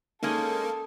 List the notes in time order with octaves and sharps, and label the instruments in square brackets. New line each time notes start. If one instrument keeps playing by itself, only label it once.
[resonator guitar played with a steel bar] G#3 C#4 D#4 [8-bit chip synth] A#3 [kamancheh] A4